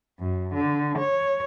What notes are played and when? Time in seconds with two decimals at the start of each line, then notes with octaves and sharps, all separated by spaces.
0.18 F#2
0.53 D3
0.96 C#5